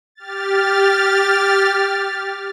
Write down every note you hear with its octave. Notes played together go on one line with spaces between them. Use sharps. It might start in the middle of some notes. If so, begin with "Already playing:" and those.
G4 F6 A6